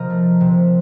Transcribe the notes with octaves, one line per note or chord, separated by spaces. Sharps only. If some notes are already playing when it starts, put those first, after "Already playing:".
Already playing: C3 F3 A#4 D#5
A3
C3